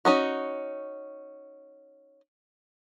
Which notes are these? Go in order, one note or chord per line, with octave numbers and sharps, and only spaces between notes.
C#4 D#4 F#4